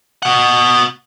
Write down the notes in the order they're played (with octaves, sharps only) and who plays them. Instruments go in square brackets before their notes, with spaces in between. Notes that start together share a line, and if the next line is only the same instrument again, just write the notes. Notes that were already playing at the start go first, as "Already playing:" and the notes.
[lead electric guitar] B2 F#5